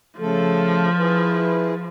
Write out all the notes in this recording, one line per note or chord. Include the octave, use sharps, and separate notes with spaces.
C#3 F3 A3 A4
E4 G#4 B4